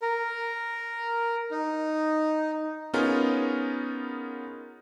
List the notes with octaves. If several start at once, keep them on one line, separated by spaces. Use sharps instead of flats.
A#4
D#4
B3 C#4 D#4 F4 G#4 A#4